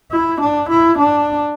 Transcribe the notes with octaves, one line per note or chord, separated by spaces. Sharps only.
E4
D4
E4
D4